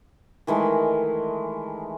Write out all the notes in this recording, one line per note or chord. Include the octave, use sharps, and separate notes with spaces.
D#3 E3 G#3 A3